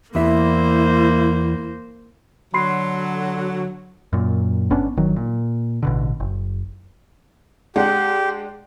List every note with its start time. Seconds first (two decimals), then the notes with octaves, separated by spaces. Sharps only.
0.15 E2 A#3 E4 C5 E5
2.54 D3 F#3 B5 C6 C7
4.13 F#2 A#2
4.70 G1 B3 C#4 D4
4.97 G1 D#3 F#3
5.16 A#2
5.83 A1 B2 D3
6.20 F#1
7.76 G#3 D4 G4 F#5